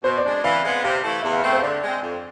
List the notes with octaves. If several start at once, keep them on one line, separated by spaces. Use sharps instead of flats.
B2 C5
D5
G#3 D4
E3 F5
G#3 B3
C3 F5
E3 A3 E4 A4
E2 E5
F5
B2 A3 C4 E5
C5
D3 D5
G#3 C4
F2